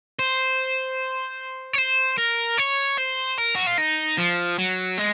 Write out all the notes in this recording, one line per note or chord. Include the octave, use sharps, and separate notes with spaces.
C5
C#5
C5
A#4
C#5
C5
A#4
F#4
F4
D#4
F3
F#3
G#3